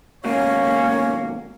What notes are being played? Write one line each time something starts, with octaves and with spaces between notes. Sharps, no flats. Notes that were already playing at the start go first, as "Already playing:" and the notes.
D#2 G#2 B2 A#3 C#4 C#5